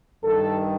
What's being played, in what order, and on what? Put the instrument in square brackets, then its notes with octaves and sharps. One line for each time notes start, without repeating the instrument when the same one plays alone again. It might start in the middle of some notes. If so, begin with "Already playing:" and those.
[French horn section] G2 D#3 A4